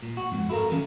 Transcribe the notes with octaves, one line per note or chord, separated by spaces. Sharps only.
A#2
F#4
F2 G#2
E4 F#4 A4 A#4 F5
D3 E3 C#4